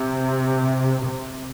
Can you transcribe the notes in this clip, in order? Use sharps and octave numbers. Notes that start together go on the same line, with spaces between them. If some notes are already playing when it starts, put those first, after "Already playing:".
Already playing: C3
C3